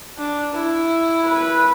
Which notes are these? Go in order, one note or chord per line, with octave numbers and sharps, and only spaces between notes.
D4
E4
B4